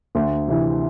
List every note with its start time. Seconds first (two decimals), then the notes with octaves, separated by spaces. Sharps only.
0.15 D2
0.48 C3 E3